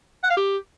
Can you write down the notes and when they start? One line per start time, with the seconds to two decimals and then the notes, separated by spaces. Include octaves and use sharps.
0.23 F#5
0.30 F5
0.37 G4